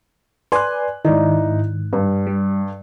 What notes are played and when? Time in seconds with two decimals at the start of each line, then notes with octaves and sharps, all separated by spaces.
0.52 B4 D5 G#5 C6 F#6
1.05 G#2 D#3 D#4 E4 D5
1.93 G2
2.27 G3